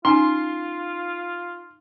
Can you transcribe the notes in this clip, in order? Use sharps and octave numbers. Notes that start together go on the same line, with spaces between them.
C#4 D#4 F4 G#5 A#5 C6